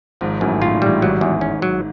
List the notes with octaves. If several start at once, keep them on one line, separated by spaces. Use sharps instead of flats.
G#1 G#2 F3
A1 F#2 A2
A2 F4
A#2
A1 A2 G3
G#1 G#2 F#3
E2
C#4
F#3